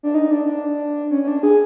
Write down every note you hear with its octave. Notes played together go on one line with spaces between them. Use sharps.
D4
D#4
D4
D4
C#4
C#4
D4
G#4